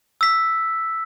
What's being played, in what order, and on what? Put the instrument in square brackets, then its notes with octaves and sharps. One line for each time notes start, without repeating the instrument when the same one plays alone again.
[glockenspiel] E6 B6